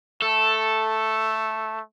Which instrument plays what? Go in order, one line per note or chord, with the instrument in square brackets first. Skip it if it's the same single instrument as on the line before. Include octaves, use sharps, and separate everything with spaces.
[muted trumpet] A3 [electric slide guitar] A4